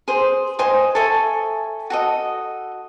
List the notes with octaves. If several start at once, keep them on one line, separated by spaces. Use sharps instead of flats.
G#4 C5
C5 D#5 G#5 D#6
A4 E5 G#5 C#6
F#4 A4 D#5